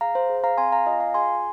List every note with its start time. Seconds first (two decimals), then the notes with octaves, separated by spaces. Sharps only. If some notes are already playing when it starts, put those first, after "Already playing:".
0.01 G#4 F5 A#5
0.15 C5
0.30 G#4
0.44 F5 A#5
0.58 C4 G#5 C6
0.72 F5 A#5
0.86 F4 D#5 G#5
1.00 F5 A#5
1.14 G#4 G#5 C6